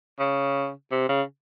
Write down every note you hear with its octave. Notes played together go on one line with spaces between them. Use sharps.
C#3
C3
C#3